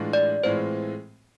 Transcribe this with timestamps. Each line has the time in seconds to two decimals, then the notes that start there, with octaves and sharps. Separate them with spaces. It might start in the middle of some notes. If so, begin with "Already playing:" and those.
Already playing: A2 E3 G#3 D4 F4
0.13 D5
0.44 A2 E3 G#3 C4 F4 C5